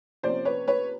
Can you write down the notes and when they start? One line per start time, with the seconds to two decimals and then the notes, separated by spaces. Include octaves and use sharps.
0.23 C3 F3 A#3 C#4 C5 D5
0.45 B4 C#5
0.68 B4 C#5